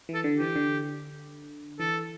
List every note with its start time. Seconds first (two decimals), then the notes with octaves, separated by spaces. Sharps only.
0.09 E3
0.14 A4
0.24 D3
0.35 E3 G4
0.56 D3
1.79 E3 A4